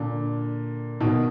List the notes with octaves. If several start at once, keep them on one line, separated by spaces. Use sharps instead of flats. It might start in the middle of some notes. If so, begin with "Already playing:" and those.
Already playing: A#2 D3
B2 D#3